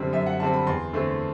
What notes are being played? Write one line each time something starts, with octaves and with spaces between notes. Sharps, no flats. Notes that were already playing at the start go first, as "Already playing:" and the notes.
Already playing: F#2 D3 G3 C4
F#2 E5
F#5
D3 G3 C4 A5
B5
E2 C6
D3 A3 C4